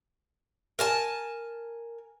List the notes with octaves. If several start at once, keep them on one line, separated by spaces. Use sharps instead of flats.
A#4 G#5 A5